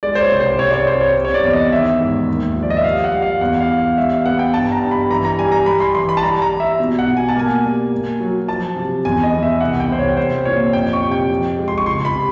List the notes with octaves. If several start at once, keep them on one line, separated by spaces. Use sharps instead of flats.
G#3 D5
C5
C#5
C2
C5
C5
C2 C#5
D5
C#5
C2 C5
C#5
C3
C#5
D5
E2
D#5
D#3 E5
G#2
D#2
F3
D5
D#5
E5
G3 F5
F#5
G3
F5
E2 F#5
F5
E2
F5
G3 E5
F5
B3 F#5
G5
G2 A5
A#5
G2
B5
E3 A#5
A#5
G3 G#5
A#5
G3 B5
C6
E3 C6
B5
A5
G3 A#5
A#5
G3
E5
B2
F#5
B2
G#5
A5
A#3 G#5
G3
A#3
F#3
F3 A5
C3
E2 G#5
D#5
E2
E5
C2 F#5
G5
C2 C5
C#5
C2 C5
A#2 C#5
F2 G5
C#6
C3
G5
F3
G#3
C6
C#6
C#2 C6
B5
C3